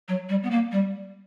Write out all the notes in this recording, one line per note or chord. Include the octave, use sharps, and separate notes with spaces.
F#3
G3
B3
A#3
G3